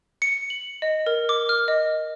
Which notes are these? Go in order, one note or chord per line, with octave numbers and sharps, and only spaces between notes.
C#7
F#7
D#5
A#4
D6
F6
D#5